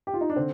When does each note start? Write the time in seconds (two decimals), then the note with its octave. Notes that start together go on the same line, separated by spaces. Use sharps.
0.07 G4
0.14 F4
0.21 D#4
0.30 D4
0.36 D3 C4